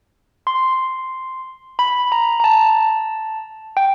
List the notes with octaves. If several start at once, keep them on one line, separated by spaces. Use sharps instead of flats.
C6
B5
A#5
A#5
A5
G5